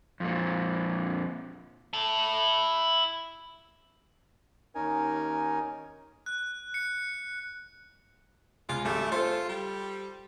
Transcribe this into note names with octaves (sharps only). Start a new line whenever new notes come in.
F2 A#2
E4 A5
D#2 C#4 D#4 A#4 G#5
F#6
C#7
C#2 F4
G#1 G3 A3
F4 A4 C5
G3